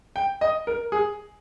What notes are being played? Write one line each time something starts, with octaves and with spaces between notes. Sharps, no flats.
G5
D#5
A#4
G#4